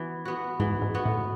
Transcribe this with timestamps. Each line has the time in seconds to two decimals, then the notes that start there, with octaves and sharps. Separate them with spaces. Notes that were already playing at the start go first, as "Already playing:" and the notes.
Already playing: E3 B3 F#4
0.25 B3 F#4
0.60 G#2 E3
0.82 G#2
0.95 B3 F#4
1.06 A2